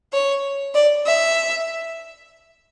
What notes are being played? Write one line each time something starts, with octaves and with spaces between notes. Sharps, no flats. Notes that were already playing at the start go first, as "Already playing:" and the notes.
C#5
D5
E5